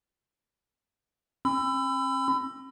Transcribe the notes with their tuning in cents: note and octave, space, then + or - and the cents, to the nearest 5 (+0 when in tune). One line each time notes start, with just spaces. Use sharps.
C4 +45 B5 +30 E6 +20